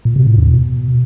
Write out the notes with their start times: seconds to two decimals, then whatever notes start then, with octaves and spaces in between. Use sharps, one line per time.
0.05 A#2
0.16 C3
0.27 A2
0.37 E2
0.48 B2